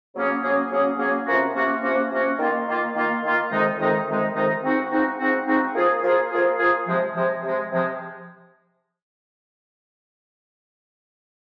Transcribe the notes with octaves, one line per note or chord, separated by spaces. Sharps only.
C#3 F#3 A#3 C#4 G#4
C#3 F#3 A#3 C#4 G#4
C#3 F#3 A#3 C#4 G#4
C#3 F#3 A#3 C#4 G#4
C3 F3 A#3 C#4 F#4
C3 F3 A#3 C#4 F#4
C3 F3 A#3 C#4 F#4
C3 F3 A#3 C#4 F#4
D#3 A#3 F4
D#3 A#3 F4
D#3 A#3 F4
D#3 A#3 F4
F2 C3 D#3 G#3 D#4
F2 C3 D#3 G#3 D#4
F2 C3 D#3 G#3 D#4
F2 C3 D#3 G#3 D#4
G#2 F3 C4 D#4 F#4
G#2 F3 C4 D#4 F#4
G#2 F3 C4 D#4 F#4
G#2 F3 C4 D#4 F#4
F3 A#3 F4 G#4
F3 A#3 F4 G#4
F3 A#3 F4 G#4
F3 A#3 F4 G#4
C3 F3 G#3
C3 F3 G#3
C3 F3 G#3
C3 F3 G#3